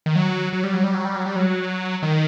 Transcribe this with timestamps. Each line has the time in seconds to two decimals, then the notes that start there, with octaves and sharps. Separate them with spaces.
0.06 D#3
0.15 F#3
0.53 F#3
0.64 G3
0.74 F#3
0.84 G3
0.94 F#3
1.05 G3
1.15 F#3
1.26 G3
1.36 F#3
2.03 D#3